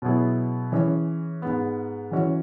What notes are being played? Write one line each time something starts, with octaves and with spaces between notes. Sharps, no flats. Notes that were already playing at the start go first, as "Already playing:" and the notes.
B2 F#3 B3 E4 G#4
E3 C#4 G#4
G#2 G#3 B3
E3 C#4 F#4